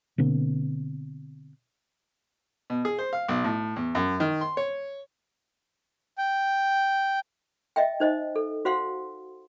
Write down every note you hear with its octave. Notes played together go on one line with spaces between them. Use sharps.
B2 D3 A#3 C4
B2
G#4
C5
F5
B1
A2
E2
F#2
D#3
C6
C#5
G5
D#5 E5 G5
D#4 C5 D#5
A4
F#4 C5 F5 F#5 C6